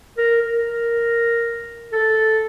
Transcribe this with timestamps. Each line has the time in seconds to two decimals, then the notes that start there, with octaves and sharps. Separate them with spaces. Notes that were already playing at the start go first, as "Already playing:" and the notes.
0.18 A#4
0.42 A#4
1.92 A4